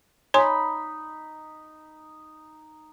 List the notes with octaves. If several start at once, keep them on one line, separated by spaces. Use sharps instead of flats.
D#4 C#5 D#5 G#5 B5 C6